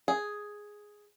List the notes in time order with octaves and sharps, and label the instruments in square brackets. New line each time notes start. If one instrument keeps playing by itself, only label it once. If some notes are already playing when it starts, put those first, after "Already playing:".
[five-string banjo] G#4